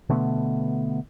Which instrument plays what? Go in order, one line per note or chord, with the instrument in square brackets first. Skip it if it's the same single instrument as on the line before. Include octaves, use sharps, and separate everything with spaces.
[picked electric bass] B2 D3 A3 B3